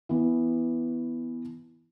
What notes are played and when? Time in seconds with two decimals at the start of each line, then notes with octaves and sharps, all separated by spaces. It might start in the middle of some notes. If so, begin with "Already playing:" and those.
0.09 E3 B3